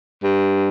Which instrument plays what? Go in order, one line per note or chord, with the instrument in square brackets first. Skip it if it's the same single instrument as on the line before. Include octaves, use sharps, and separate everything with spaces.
[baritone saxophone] G2